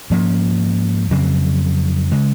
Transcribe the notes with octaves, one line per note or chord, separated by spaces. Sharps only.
G#2 F3 A#3 C#4
F2 C#3 F#3 C4
C#3 G#3